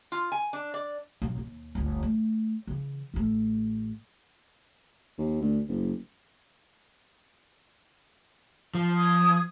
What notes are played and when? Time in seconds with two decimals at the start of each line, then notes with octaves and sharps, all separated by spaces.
0.12 F4
0.32 G#5
0.53 D4
0.74 D5
1.22 B1 F#3
1.38 D#2
1.75 G1 D2
2.03 A3
2.67 C#3 E3
3.14 A1 A3
5.18 D#2
5.41 D2
5.69 F#1
8.75 F3
8.97 D#6 G#6